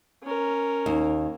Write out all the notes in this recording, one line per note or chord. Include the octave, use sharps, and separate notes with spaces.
C#4 A#4
D#2